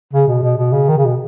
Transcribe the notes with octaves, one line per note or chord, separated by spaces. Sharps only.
C#3
B2
B2
B2
C#3
D#3
C#3
B2